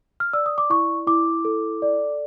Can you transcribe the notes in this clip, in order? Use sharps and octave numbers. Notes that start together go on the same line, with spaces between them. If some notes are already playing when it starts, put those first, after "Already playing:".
F6
D5 E6
D#6
D6
E4 C#6
E4 D6
A4
D5